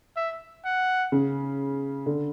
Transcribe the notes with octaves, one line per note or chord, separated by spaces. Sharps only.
E5
F#5
C#3
D3